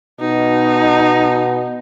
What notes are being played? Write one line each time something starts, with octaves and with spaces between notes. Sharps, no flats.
B2 D#4